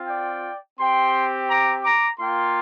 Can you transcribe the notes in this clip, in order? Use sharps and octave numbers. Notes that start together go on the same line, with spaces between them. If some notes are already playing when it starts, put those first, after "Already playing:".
Already playing: C4 F4
D5 G5
C4 G4 G5 C6
A#5 D6
A#5 D6
A#3 F4 G5 C6